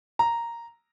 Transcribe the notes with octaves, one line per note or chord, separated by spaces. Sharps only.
A#5